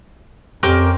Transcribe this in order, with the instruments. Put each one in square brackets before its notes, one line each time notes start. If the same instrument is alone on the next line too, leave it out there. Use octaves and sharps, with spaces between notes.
[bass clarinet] F2 [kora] C4 C#4 G4 [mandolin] A#4 D6 G6